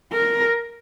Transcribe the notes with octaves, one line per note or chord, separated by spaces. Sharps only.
A#4